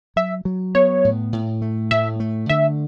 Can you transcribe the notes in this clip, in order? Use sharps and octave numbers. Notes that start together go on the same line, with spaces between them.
F#3 E5
F#3
B3 C#5
A2
A2
A3
A2 E5
A3
D3 E5